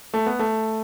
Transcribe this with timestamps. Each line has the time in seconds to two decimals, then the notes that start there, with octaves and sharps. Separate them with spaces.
0.14 A3
0.26 B3
0.39 A3